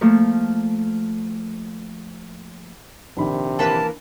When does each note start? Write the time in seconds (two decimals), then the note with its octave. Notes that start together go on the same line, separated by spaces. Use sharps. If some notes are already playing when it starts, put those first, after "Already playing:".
0.01 F3 A3 A#3
3.17 A#1 C3 D#3 B5
3.59 E3 A#3 B4 A5